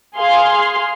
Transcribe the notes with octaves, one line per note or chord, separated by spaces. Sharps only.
G#4 F5 C6